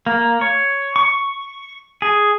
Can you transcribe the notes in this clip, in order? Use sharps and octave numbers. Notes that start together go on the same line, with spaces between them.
A#3
C#5
C#6
G#4